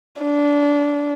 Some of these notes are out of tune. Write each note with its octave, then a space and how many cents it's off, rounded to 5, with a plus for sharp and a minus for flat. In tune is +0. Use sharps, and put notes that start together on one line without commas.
D4 -20